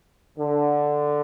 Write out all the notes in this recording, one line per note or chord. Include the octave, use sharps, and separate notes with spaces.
D3